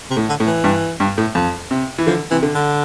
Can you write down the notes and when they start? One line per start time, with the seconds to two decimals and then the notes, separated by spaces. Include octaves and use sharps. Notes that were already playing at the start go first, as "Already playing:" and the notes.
0.10 C3
0.17 A2
0.29 D3
0.40 A2
0.47 E3
0.64 G2
1.00 G2
1.18 A2
1.35 F2
1.71 C3
1.98 E3
2.07 D3 F3
2.31 C3 E3
2.43 D3
2.55 D3